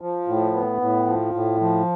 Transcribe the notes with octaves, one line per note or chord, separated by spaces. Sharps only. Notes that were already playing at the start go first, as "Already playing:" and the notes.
F3
A2
B3
A2
F3
A2
F3